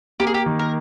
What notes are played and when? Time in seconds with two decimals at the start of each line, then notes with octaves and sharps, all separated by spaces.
0.20 A#3 G4
0.27 G#4
0.34 G4
0.46 D#3
0.59 A#4